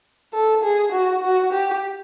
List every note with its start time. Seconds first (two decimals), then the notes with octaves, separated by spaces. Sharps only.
0.34 A4
0.64 G#4
0.92 F#4
1.23 F#4
1.53 G4